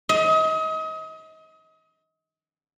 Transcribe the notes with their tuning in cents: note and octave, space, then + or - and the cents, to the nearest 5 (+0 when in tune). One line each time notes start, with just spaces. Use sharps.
D#5 +35